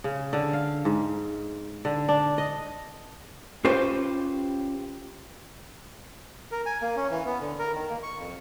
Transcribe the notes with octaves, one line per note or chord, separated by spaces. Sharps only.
C#3
D3
F5
G#2
D3
D4
D#5
C#4 F4 G4 B4 C5
A#4
G#5
A#3
C#4
E3
B3
D3
A#4
D#3
A#3
C#6
F2